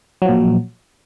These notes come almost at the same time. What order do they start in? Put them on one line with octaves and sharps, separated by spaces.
F#3 F3 A#2